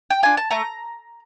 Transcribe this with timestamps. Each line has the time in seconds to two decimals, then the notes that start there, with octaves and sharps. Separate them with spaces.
0.10 G5
0.23 D4 F4 G#5
0.37 A5
0.51 A3 A#5